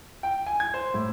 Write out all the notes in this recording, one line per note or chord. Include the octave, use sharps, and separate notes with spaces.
G5
G#5
G#6
C5
A2